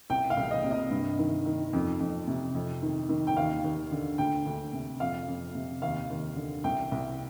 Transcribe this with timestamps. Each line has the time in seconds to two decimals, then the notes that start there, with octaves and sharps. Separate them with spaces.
0.10 C2 G5
0.30 F5
0.37 C2
0.51 D#5
0.64 C3
0.71 D#5
0.91 G2
1.19 D#3
1.46 D#3
1.73 F2
2.00 F2
2.27 C3
2.55 F2
2.82 D#3
3.09 D#3
3.27 G5
3.37 D#2 F5
3.64 D#2
3.92 D3
4.18 D2 G5
4.46 D2
4.73 C3
5.00 F2 F5
5.28 F2
5.55 C3
5.82 D#2 F5
6.10 D#2
6.36 D3
6.64 C2 G5
6.92 C2